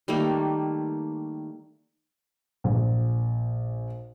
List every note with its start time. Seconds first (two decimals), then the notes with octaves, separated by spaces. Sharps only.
0.08 D#3 G3 A3 A#3
2.64 A#1